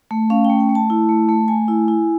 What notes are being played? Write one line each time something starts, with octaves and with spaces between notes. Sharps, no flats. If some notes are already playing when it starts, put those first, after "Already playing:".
A3
C#4 F5
A3 G5
G5
A3
A5
E4
A3
A3
A3 G#5
E4
E4